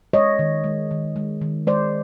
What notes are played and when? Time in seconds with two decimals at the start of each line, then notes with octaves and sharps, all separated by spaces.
0.13 G#3 C#5 D#5
0.39 D#3
0.64 G#3
0.91 D#3
1.16 G#3
1.41 D#3
1.67 G#3 C5 D5